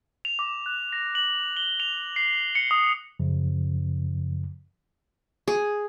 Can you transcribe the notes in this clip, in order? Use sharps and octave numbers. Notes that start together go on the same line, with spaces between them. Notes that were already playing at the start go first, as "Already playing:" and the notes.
F7
D6
F#6
A#6
F#7
G7
F7
C7
C#7
D#6
F#2 C#3 F3
G#4